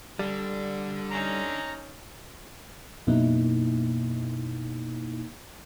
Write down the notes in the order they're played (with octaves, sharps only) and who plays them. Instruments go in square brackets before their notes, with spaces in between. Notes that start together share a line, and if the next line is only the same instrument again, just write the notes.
[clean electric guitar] G3 [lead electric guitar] D4 A4
[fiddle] C#4 D#4 [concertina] A#5
[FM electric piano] F#2 B2 A#3 D#4 E4